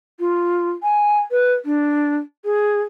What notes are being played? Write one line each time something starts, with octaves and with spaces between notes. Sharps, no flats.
F4
G#5
B4
D4
G#4